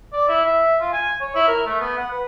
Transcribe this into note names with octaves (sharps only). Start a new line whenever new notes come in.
D5
E4
E5
F4
G#5
C#5
E4
A#4
A3
B3
F#5
B4